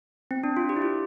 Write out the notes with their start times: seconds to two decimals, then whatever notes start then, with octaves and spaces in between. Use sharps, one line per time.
0.31 C4
0.44 D4
0.57 F4
0.69 G4
0.77 E4
0.82 F4